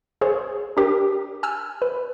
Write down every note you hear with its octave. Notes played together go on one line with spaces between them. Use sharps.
G#4 C5 C#5
D4 G4 A#4
G#5 E6 F6
B4